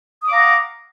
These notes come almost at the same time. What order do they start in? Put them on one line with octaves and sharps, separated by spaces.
D#6 D6 F5 A#5 F#5